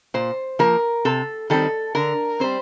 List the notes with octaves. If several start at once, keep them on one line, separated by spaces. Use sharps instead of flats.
A#2 C5
F3 A#3 A#4
C3 A4
D#3 G3 C4 A4
D3 A#4
G3 C4 C5